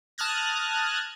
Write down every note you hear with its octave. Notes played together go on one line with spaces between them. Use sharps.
A5 D#6 F6 F#6 G#6 A#6